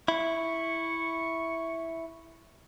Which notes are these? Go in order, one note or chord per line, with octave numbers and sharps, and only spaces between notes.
E4 C#6